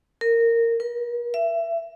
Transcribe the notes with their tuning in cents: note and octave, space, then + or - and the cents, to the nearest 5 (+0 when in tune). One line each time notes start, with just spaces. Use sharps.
A#4 -15
A#4 +45
E5 +25